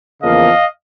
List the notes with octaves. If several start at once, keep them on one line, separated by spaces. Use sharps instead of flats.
E2 C#3 F3 A#3 D#5 F5